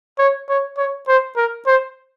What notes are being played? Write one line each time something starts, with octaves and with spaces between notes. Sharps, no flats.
C#5
C#5
C#5
C5
A#4
C5